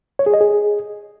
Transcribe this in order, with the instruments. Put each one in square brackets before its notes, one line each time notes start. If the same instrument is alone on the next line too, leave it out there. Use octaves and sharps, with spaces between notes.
[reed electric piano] C#5
G#4
D#5
G#4